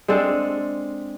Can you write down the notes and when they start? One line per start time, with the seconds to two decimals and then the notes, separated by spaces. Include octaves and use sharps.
0.08 G#3 C4 D4 A4